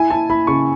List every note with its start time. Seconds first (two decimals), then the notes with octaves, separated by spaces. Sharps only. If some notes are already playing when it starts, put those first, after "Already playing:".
Already playing: E4 G#5
0.10 E4 A5
0.30 E4 B5
0.47 C#3 C#6